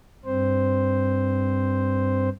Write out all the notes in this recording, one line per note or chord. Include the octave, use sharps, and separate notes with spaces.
G2 C4 C5